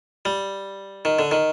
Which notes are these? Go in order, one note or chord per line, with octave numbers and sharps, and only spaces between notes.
G3
D#3
D3
D#3